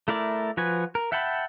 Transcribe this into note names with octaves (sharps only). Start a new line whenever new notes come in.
A3 E4 A#4 D5
F3 F#4 B4 G#5
A#4
E5 F#5 G5 A5 B5